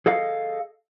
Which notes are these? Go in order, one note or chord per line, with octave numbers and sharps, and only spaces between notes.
G#4 A4 D#5 F5